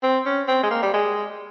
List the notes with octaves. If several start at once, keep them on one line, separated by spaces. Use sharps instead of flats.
C4
C#4
C4
G#3
A#3
G3
G#3